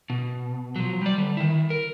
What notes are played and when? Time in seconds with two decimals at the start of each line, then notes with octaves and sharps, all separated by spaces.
0.10 B2
0.76 F3 F#3
1.02 G3 D5
1.18 D3 G3
1.37 D#3 E4
1.70 A#4